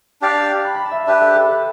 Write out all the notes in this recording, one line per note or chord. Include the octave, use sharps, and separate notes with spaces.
D4 G4 D5 F5
B5
B5
A5
E5
F5
D4 G4 B4 E5
A4
A4
B4